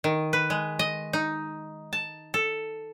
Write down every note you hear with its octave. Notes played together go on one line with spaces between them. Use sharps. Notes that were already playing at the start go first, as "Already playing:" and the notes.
D#3
B4
G#3
D#5
D#4
A5
A4